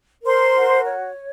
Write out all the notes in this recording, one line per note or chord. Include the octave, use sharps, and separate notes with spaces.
A#4 C5 C6
F#4
C#5